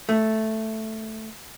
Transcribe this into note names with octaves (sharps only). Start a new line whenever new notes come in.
A3